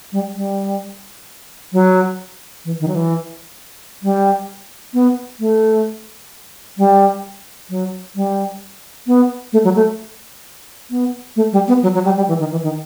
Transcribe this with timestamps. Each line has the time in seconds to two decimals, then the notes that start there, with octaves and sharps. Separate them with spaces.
0.12 G3
0.35 G3
1.73 F#3
2.65 E3
2.80 D#3
2.88 F#3
2.95 E3
4.03 G3
4.94 B3
5.40 A3
6.78 G3
7.70 F#3
8.15 G3
9.07 B3
9.53 A3
9.64 F#3
9.76 A3
10.91 B3
11.36 A3
11.53 G3
11.68 B3
11.83 F#3
11.94 F#3
12.05 G3
12.17 G3
12.28 E3
12.40 D#3
12.51 E3
12.63 D#3